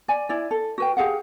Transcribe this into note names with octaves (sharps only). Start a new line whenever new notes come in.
D5 G#5
E4 D5
A4
F#4 B4 G5
G4 G#4 F5 F#5